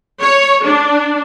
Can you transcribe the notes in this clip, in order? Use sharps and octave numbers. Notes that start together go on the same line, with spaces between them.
C#5
D4